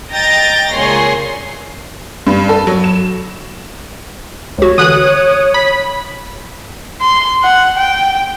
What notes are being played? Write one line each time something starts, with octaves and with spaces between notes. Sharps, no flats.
D#5 G5 A#5 G6 A6 A#6
C#2 A#2 G#4 C#5 C6
G2
A4
F#3
E7
C#2 F#4 C#5
D3 E3 D#6 F#6
B5
C6
F#5
G5